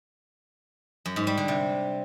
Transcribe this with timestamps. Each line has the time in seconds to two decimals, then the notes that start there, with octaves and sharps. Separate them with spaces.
1.06 F#2
1.16 G#2
1.27 G3
1.38 D3
1.48 C3